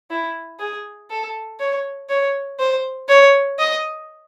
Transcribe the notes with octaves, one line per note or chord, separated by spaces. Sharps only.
E4
G#4
A4
C#5
C#5
C5
C#5
D#5